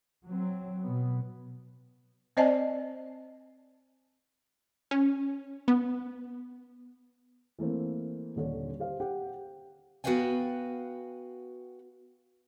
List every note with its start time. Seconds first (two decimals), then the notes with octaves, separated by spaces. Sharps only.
0.26 F#3 C4
0.84 B2 F#3 B3
2.37 C4 C5 D5 D#5 G#5 A5
4.91 C#4
5.68 B3
7.59 E3 A3 A#3 C4
8.36 D#1 D3 C#5
8.80 G4 C5 F5
9.00 G4 F#5 G5
10.04 B3 F#4 B4 F5 G5 G#5